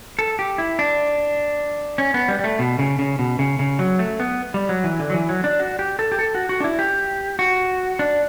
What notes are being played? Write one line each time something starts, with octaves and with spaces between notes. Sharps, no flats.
A4
G4
E4
D4
C#4
B3
G3
G3
A3
B2
C#3
C#3
B2
C#3
C#3
F#3
A3
B3
G3
F#3
E3
D3
F#3
E3
F#3
D4
F#4
G4
A4
G4
A4
F#4
F#4
D4
E4
G4
F#4
D4